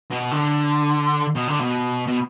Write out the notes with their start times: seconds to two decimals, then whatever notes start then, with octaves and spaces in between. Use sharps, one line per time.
0.10 B2
0.31 D3
1.35 B2
1.48 D3
1.60 B2
2.07 B2